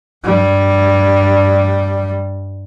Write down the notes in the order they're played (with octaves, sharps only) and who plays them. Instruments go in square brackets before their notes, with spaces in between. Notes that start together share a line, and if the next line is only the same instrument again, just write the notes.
[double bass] G2 G3